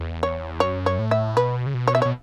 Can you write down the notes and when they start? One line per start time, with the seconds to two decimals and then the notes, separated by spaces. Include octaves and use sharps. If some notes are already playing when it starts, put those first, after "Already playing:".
Already playing: E2
0.23 C#5
0.60 F#2 C#5
0.86 C#5
0.99 A2
1.11 E5
1.37 B2 B4
1.66 C#3
1.74 B2
1.88 C#5
1.95 E5
2.02 C#5
2.05 B2